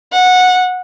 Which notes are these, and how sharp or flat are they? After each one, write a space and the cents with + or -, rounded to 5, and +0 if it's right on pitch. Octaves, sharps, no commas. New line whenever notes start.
F#5 -15